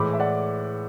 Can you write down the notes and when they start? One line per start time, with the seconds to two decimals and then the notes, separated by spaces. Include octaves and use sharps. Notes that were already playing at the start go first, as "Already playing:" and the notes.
Already playing: A2 E3 G#3 B5 D6
0.13 E5
0.20 D5 F#5